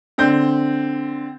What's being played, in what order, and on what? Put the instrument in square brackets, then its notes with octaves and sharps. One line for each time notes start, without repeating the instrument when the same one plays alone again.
[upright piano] D3 C4 G6